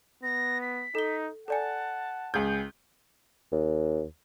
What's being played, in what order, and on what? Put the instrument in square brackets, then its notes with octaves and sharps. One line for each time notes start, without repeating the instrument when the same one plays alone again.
[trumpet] B3 [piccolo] A#6
[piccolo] B6
[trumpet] D#4 [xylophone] A4 G7
[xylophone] A4 D5 G#5 [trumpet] F#5 [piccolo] A5
[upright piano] C#2 G#4 G6
[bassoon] D#2